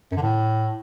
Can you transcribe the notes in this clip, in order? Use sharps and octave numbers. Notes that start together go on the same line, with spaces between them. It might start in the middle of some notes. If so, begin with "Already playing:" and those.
F#2
D3
A2